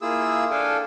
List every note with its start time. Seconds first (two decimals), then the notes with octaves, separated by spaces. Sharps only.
0.01 A#3 E4 F4 G#4 E6
0.51 D4 A4 F5 G5 G#5